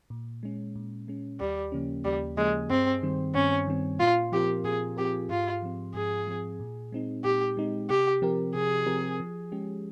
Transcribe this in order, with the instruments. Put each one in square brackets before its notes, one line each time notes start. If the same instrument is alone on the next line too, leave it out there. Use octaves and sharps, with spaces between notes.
[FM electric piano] A#2
G#3 C#4
A#2
G#3 C#4
[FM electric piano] D#2 [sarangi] G3
[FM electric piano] C#3 F3 A#3 C#4
[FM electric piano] D#2 [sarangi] G3
[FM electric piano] C#3 F3 A#3 C#4 [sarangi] G#3
[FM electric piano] G2 [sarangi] C4
[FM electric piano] D#3 G3 C4
[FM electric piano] G2 [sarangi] C#4
[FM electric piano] D#3 G3 C4
[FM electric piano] A#2 [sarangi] F4
[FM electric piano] F3 C4 F4 A#4 [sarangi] G4
[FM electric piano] A#2 [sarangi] G#4
[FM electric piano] F3 C4 F4 A#4 [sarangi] G4
[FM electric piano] G#2 [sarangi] F4
[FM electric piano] F3 C4
[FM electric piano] G#2 [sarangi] G#4
[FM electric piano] F3 C4
A#2
G#3 C4 D#4
[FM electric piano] A#2 [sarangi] G4
[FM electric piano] G#3 C4 D#4
[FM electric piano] C3 [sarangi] G4
[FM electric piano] F3 C4 G4 A#4
[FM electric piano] C3 [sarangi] G#4
[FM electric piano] F3 C4 G4 A#4
F3
G#3 C#4 G4